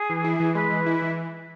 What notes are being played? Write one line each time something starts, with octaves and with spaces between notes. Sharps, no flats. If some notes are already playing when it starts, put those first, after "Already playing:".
Already playing: G#4
E3
E4
E3
G#3 B4
E3
E4
E3